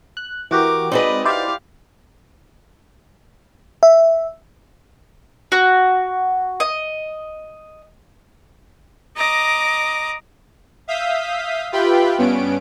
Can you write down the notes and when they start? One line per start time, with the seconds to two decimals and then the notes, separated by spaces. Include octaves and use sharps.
0.17 F#6
0.51 E3 F#4 G4 A#4 D6
0.92 G#3 C4 D#4 F#4 B4 D5 D#5
1.25 E4 G4 C5 D5 F5
3.83 E5
5.52 F#4
6.60 D#5
9.16 D#5 A#5 D6
10.88 E5 F5 D#6 G6 B6
11.72 F4 G4 B4 E5 G5 B5
12.18 G2 B3 C#4 D7